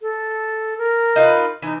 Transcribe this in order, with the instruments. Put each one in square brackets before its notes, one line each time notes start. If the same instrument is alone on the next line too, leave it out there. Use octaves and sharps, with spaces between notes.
[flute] A4
A#4
[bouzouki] D#4 F4 B4
[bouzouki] E3 [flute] D#4